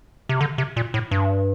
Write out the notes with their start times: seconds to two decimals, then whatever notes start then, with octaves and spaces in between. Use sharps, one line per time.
0.29 C3
0.41 D3
0.58 C3
0.76 A#2
0.94 A2
1.11 G2